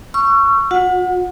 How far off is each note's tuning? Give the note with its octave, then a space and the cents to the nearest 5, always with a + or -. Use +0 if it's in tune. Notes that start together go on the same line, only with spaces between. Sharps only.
C#6 +0 E6 +45
F4 +40 F#5 -15